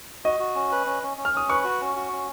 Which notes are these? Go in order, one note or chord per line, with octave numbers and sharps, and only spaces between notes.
F#4 D#5
F#4
C#4
B4
C#4
C#4
C#4
F6
C#4 D#6
B4 C#6
F#4
C#4
F#4
C#4